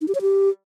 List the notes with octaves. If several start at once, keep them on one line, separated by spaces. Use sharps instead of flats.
D#4
G4
C#5
G4